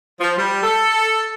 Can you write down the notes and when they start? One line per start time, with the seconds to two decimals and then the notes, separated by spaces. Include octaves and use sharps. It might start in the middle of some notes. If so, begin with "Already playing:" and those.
0.20 F3
0.37 G3
0.63 A4